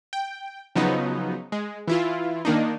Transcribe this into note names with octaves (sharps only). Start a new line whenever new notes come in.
G5
C#3 F3 F#3 B3 D#4
G#3
E3 E4 F4
D#3 A#3 D4 D#4